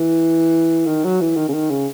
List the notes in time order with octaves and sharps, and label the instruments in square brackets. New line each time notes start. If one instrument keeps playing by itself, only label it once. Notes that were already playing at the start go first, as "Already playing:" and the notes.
Already playing: [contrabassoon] E3
D#3
F#3
E3
D#3
C#3
D#3
C#3